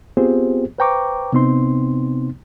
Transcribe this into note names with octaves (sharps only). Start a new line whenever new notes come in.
B3 C4 F4 G4 G#4 C5
B4 C5 G5 A#5 C#6 D6
C3 B3 C4 D#4 C6